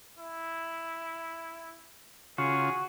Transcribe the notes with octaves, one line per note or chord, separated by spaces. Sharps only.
E4
C#3 F4 F#4 G#4